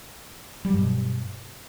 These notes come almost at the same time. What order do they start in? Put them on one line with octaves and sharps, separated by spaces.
G3 F#3 G2 B2